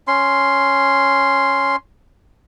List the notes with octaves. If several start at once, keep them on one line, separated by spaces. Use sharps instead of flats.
C#4 C6